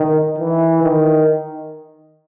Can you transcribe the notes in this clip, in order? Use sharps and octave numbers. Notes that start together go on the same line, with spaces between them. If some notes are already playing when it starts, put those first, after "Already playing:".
Already playing: D#3
E3
D#3